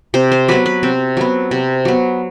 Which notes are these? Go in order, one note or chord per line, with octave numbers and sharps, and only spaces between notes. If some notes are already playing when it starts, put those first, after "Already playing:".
C3 C5
C5
F#3 B3 B4
B4
C3 C4
F#3 B3
C3
F#3 B3